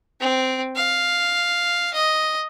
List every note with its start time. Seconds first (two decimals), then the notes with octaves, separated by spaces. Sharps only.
0.21 C4
0.76 F5
1.94 D#5